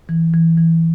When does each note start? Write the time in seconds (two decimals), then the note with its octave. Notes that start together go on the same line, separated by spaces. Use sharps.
0.09 E3
0.34 E3
0.58 E3